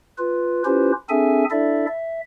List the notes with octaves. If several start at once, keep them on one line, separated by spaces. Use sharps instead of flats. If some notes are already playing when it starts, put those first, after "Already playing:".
F4 B4
C#4 E4 F4 G4 B4 C5
C4 D4 G#4 A4 E5 G#5
D4 E4 A4 D5 E5
E5